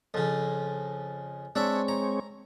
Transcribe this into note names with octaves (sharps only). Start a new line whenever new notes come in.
F2 C#3
G#3 C4 D4 C#5 E5
A#5